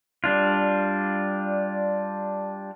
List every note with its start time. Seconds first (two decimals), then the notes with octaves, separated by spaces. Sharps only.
0.24 G3 D4 F4